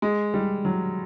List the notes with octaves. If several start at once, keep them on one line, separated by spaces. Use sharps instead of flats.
G#3
G3
F#3